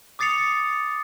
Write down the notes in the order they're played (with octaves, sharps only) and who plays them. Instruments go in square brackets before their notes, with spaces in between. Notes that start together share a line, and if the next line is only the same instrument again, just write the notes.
[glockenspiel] D6 D#6 A6 C7 C#7 F7